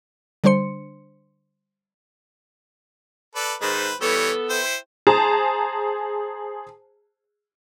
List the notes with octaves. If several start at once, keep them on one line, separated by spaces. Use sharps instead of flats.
D3 G3 D4 C5 C6 C#7
A4 B4 D5
G#2 D#3 B4 C5
E3 G3 B3 A4 C#5
E4 C5 G5
G#4 C5 A5 A#5